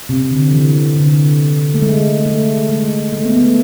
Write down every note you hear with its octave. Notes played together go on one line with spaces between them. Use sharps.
C3
D3
E3
D3
A3
G#3
A3
G#3
A3
B3
A3